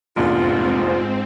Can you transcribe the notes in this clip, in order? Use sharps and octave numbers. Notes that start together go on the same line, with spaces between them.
F1 A#1 E2 G#2 C4 F4